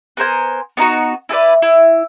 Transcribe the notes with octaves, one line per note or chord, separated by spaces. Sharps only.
B3 A#4 C5 G#5
B3 D#4 F4 F#4
E4 A4 B4 D5
E4